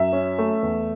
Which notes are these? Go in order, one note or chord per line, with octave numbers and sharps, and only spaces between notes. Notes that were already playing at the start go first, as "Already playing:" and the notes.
Already playing: F#2 E5
C#4
A3
E2